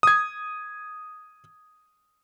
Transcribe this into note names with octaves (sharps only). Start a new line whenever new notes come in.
D#6 G#6